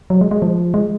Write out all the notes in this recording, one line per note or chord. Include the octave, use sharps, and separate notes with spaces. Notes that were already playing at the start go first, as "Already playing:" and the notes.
F#3
G#3
G#3
F3
G#3